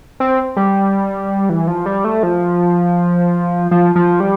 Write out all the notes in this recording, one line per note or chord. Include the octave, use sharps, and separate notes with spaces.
C4
G3
E3
F3
G3
A3
F3
F3
F3
G3